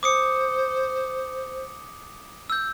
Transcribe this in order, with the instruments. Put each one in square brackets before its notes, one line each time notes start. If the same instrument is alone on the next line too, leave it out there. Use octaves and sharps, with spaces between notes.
[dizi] C5 [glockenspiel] D6 D#6 C#7
[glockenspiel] E6 G6